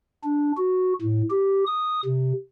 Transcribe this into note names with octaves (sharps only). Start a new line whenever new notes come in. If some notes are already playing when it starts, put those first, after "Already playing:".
D4
F#4
A2
G4
D#6
C3